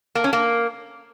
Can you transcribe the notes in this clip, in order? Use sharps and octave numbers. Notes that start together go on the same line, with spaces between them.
A#3
C#4
A#3